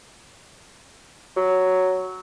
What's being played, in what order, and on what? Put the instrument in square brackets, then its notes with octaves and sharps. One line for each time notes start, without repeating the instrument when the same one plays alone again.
[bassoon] F#3